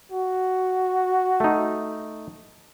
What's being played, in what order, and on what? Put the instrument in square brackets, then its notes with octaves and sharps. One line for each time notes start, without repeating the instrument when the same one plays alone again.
[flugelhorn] F#4
[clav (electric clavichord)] A3 D#4